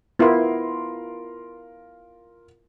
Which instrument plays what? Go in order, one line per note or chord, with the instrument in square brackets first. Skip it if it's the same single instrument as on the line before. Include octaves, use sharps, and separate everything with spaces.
[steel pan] B3 E4 [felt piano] F4 A#4 C6